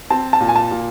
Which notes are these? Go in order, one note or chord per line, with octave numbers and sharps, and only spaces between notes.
C4 A5
A5
A#2
G#5
A5
A#2